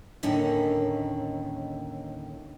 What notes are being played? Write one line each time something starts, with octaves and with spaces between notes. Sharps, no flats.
D#2 A2 D3 D#3 C#4 E5